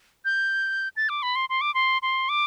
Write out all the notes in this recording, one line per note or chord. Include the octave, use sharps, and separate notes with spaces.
G6
A6
D6
B5
C6
C6
D6
C6
C6
D6